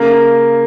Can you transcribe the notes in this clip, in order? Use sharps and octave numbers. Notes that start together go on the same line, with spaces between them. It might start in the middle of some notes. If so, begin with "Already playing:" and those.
Already playing: C#3 A#3